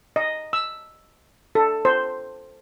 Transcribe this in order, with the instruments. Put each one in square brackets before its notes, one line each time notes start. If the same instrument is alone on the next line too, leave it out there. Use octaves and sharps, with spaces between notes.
[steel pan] D#5
E6
A4
C5